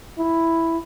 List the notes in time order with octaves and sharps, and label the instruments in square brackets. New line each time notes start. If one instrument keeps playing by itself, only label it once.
[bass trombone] E4